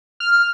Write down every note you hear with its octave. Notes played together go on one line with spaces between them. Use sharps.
F6